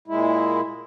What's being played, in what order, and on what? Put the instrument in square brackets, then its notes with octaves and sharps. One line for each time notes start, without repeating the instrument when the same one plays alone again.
[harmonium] A#2 G#3 E4